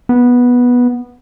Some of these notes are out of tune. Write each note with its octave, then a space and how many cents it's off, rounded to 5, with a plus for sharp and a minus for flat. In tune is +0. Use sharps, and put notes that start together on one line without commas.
B3 -10